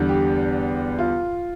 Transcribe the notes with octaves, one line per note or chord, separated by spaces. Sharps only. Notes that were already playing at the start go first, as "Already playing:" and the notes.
Already playing: E2 D3 G3
G4
F4